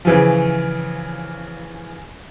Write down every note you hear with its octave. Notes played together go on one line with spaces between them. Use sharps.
C#3 E3 F3